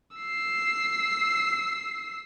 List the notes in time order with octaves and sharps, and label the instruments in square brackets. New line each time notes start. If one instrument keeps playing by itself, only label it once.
[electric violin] E6 C7